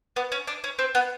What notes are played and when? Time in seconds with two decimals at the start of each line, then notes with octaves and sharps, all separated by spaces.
0.16 B3
0.32 C#4
0.47 D4
0.64 C#4
0.79 C4
0.95 B3